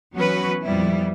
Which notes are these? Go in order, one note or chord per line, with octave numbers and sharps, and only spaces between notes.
E3 F#3 B3 C#4 F#4 B4
F2 A#2 G3 B3 E4